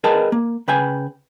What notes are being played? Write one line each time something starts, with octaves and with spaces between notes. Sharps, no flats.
G#4 A#4 B4 D#5 G5 A5
A#3
C#3 B4 G5 G#5